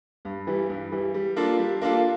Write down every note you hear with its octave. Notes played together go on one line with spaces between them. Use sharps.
G2
E3 G3
G2
E3 G3
G3
A#3 D4 F4 A4
G3
A#3 D4 F4 A4